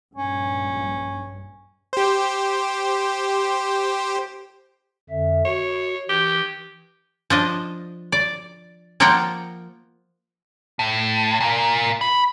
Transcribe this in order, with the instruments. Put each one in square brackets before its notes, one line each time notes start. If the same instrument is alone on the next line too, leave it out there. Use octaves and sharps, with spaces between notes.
[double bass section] A#1 G2 [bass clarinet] C#4
[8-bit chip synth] G4 C5
[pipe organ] F2 D3 E5
[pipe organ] F#4 [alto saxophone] C#5
[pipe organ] E3 [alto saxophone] G4
[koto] F3 D4 D#5
D5
F3 A#3 F4 A#4 F#5 G5
[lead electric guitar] A2
A#2 A#3
B5